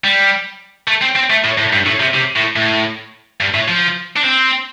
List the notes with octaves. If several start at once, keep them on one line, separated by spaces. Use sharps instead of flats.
G3
A3
C4
C4
A3
A2
A2
G2
A2
C3
C3
A2
A2
G2
A2
F3
D4
C4